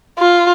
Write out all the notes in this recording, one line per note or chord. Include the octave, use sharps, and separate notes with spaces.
F4